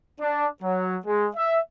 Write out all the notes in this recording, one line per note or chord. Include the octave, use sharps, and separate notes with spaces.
D4
F#3
G#3
E5